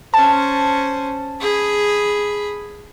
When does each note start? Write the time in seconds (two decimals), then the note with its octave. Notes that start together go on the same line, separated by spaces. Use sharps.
0.14 C#4 C5 A5
1.40 G#4 B5